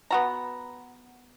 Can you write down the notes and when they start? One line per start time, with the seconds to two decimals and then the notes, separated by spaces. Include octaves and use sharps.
0.11 B3 F#4 A#5